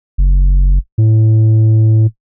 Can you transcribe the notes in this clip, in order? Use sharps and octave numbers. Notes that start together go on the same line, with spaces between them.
F#1
A2